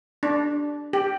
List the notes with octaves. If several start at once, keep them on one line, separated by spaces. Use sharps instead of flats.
D4
G4